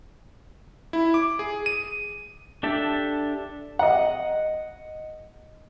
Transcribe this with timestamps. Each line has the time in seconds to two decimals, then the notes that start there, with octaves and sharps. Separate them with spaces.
0.93 E4
1.14 D6
1.39 G#4
1.66 D#7
2.63 D4 G4 A4 E5 A5
3.79 D#5 F#5